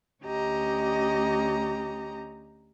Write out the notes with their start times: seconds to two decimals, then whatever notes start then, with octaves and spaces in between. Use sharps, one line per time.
0.23 D2 C#4 G4 D#5 A#5